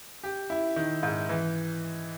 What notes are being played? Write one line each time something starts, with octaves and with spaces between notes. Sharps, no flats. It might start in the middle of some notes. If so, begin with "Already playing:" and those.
G4
E4
D#3
G#2
E3